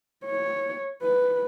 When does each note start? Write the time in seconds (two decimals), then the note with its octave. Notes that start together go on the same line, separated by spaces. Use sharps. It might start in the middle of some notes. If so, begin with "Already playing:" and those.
0.26 C#5
1.02 B4